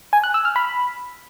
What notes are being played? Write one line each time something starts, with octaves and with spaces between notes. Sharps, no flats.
G#5
F#6
E6
F6
B5